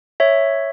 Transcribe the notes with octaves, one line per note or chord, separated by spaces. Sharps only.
C#5 E5